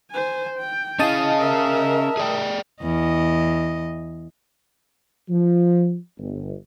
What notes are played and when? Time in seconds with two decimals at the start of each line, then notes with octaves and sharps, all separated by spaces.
0.11 C5 G#5
0.58 G5
0.99 C#4 E4 G#4 D#5 F5 A5 D#6
1.39 A#4 E5
2.17 G#4 D5 G5
2.82 E2 D#5
5.30 F3
6.18 G1